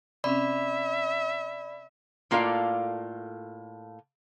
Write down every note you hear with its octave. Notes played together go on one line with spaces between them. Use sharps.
C3 C4 C#4 D5 E5 B5
A2 A#3 F4 A4 D5 F5